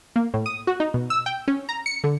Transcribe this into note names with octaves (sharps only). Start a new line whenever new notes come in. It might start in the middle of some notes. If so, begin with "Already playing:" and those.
A#3
A2
D#6
F#4
D#4
B2
E6
G5
C#4
A#5
C#7
D3